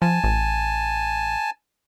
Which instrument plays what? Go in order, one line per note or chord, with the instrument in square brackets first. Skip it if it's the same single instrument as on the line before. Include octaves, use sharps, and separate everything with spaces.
[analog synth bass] F3 [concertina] G#5 A5
[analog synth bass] A1